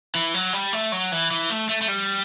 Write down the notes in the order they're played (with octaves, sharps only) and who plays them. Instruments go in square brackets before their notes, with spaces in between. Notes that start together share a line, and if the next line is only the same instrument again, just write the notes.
[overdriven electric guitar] E3
F#3
G3
A3
F#3
E3
E3
A3
A3
A3
G3